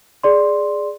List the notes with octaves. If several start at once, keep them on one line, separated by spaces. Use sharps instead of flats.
G#4 D5 C6